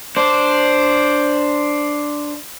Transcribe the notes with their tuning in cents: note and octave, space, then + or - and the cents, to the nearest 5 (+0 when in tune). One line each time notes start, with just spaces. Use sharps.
D4 +0 C5 +0